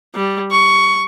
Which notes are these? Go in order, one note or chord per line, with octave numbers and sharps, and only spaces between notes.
G3
C#6